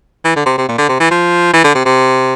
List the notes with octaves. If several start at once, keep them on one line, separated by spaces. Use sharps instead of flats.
E3
D3
C3
C3
A#2
D3
C3
E3
F3
E3
D3
C3
C3